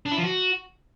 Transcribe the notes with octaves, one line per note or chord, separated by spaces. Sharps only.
D4
E4
F3
F#4